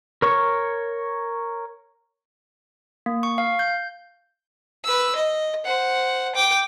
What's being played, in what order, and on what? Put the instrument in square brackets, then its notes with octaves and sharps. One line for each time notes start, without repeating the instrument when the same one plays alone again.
[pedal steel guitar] A#4 C#5 C#6
[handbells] A#3
C#6
F5
G6
[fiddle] B4 E6
D#5
C5 F#5
G5 D6